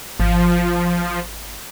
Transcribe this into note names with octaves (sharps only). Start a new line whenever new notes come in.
G#1 F3